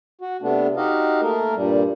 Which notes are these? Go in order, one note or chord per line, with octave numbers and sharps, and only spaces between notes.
F#4
C3 A3 B3 D4
D#4 F#4 G4 D#5 F5
A3 A#3 A#4
G2 A#2 G3